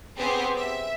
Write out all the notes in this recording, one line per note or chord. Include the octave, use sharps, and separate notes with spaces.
B3 C4 G4 G#4 C5
E5